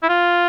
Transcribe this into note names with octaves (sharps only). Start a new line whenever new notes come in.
E4
F4